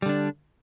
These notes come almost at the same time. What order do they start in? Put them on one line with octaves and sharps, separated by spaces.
G3 D3 D4